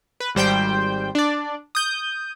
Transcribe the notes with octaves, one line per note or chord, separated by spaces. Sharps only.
B4
G#1 G3 C5 G5 G6
D4 D5
D#6 G6